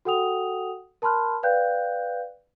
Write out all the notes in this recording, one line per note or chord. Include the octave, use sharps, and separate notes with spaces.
F#4 A4 F#5 G5 D#6 F7
A#4 A5 B5 C6 F6 F#6
B4 D5 F5 G5 F#6 G6